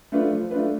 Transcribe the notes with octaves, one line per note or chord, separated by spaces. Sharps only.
A3 D4 F4 B4
F3
A3 D4 F4 B4